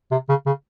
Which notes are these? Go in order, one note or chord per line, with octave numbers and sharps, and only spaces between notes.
C3
C#3
C#3